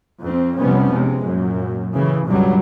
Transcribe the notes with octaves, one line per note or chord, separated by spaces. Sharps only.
F2 C4
F1 C3 F3 G3 B3 C#4
C3 G#3
F#2 A#2
A2 C#3 E3
C#2 G2 B2 F#3 G3